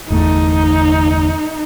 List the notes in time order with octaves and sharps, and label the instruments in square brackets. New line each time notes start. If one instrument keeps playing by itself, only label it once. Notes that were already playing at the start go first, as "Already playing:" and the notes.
[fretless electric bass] G1 E2 A3 [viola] D#4